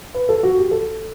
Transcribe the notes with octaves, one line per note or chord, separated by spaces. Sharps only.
B4
A4
F#4
G4
A4